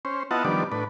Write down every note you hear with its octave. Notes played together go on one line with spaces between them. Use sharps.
C#4 C5
B3 E4 F4 D#5 F#5 A5
D#3 F3 G3 B3 D4 D5
A2 D4 B4